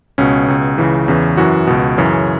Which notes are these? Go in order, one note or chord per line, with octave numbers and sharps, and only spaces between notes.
C#2 B2 C#4
C#2 B2
C#2 C#3 E3
E2 C#3 E3
F#2 E3 F#4
C#2 B2
F#2 C#3 E3 C#4